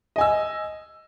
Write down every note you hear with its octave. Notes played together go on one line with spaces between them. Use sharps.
D#5 G#5 E6